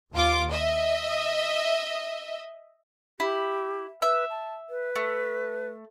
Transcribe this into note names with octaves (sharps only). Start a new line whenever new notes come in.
D#2 F4 D6
D#5 E5
E4 G4
B4 E5 E6
A5
B4
A3